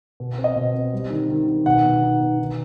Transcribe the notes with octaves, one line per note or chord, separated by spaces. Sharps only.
B2
C4
D#5
B2
C4
G3
D#3
D#3
D#3
B2 F#5
B2
D#4
B2
D#3